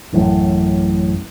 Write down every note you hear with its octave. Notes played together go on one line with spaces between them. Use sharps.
A1 F#2 A2